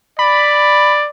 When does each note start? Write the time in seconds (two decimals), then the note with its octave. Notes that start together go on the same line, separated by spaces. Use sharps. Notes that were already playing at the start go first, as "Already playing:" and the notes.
0.19 D5 B5